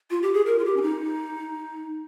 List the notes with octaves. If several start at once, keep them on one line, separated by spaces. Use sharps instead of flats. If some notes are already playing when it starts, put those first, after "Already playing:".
F4
G4
G#4
A#4
F4
G4
C#4
D#4